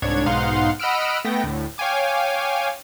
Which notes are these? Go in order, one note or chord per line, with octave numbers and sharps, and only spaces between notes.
C2 G#2 D4 C#5 G#6
B1 G#2 D#4 F5 F#5 C6
D#5 F#5 B5 E6 F6 D7
A3 B3 G5 A#6
D2 A2
C#5 F5 G5 G#5 D6